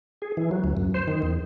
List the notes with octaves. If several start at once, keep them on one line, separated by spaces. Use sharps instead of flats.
G#4
E3
F#3
D2
F#2
C5
D#3
E2